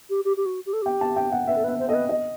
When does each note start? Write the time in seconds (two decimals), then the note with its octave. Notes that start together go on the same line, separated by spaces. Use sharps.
0.09 G4
0.24 G4
0.37 G4
0.45 F#4
0.65 G4
0.73 A4
0.82 G4 G5
1.01 A5
1.16 G5
1.32 F#5
1.47 B4 E5
1.56 A4
1.63 B4 E5
1.79 C5
1.88 A4 D#5
1.94 B4
2.09 D#5